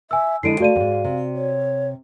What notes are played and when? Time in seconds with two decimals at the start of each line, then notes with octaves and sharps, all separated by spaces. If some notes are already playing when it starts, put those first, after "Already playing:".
0.11 E5 G#5 E6
0.43 D3 G#3 E4 D#5 C7 D7 D#7
0.60 A3 F#4 D5 F5 D#7
0.76 E2 G#2
1.04 C3
1.35 C#5